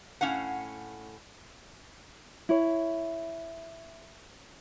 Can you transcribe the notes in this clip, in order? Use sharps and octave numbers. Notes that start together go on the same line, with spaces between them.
A2 C#4 F5 F#5
E4 C#5